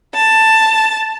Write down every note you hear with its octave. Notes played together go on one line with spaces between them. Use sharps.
A5